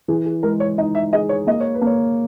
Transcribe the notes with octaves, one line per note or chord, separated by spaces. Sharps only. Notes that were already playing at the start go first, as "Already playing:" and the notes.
E3 G#4
G#4
G#3 A#4
C#5
D#4 D#5
E5
G#4 D#5
C#5
A#3 D#5
C#5
B4
A#3
C#5